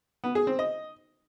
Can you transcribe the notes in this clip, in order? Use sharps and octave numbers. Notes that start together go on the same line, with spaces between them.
B3
G#4
C4
D#5